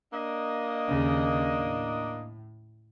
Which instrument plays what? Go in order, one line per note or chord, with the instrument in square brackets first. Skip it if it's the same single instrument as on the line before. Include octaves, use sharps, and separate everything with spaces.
[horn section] A#3 D4 D#5
[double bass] D#2 C#3
A2